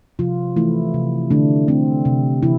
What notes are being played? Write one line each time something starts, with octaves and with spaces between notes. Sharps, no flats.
C3 F3 F4
E3 A3 E4
C3
D3 A3 D4
A3 C4
C3
C3 E3 E4